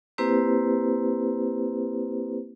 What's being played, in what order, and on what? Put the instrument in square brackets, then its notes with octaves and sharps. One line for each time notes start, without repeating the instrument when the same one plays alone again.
[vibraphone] A#3 C4 E4 G4 B4 C5